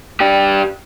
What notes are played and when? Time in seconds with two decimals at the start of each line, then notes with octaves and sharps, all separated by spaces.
0.20 D4 G4